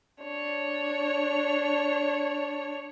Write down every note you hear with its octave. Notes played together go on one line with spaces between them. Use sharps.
D4 C#5